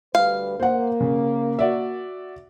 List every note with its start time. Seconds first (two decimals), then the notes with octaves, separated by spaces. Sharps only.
0.15 D2 G3 B4 F5
0.60 A#3 C5 F#5
1.00 C#3
1.59 F#4 D5 E5